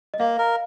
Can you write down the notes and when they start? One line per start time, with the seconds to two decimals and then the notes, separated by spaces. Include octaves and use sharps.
0.14 D#5
0.19 A#3 F5
0.38 A#4